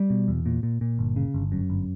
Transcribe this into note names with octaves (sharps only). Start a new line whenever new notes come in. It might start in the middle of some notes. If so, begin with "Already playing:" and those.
Already playing: G3
B2
E2
A#2
A#2
A#2
G1
C#3
G1
F#2
G1